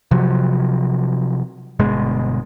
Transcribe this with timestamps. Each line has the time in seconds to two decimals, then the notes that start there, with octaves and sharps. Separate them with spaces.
0.11 C3 F3 F#3
1.79 G1 B2 G#3